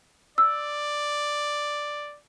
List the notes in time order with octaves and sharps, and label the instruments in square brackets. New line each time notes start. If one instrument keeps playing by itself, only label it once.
[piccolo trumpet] D5 [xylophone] E6